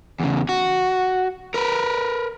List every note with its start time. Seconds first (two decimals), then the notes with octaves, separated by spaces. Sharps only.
0.20 E2 C#3
0.49 F#4
1.54 A#4 B4